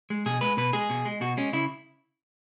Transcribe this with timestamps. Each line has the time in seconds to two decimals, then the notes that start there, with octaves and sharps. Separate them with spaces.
0.10 G#3
0.26 B2 G#4
0.41 G#3 B4
0.57 B2 B4
0.73 G#3 G#4
0.90 B2
1.05 G#3
1.21 B2 F#4
1.37 G#3 C#4
1.53 C#3 E4